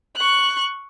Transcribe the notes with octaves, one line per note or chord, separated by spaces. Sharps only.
C#6 F#6